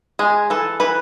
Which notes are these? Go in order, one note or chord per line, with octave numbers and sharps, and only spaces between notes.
G#3 G#4
E3 A4
E3 B4